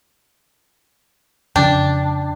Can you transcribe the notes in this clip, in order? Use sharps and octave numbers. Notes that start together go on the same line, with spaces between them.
F2 C#3 D4 G5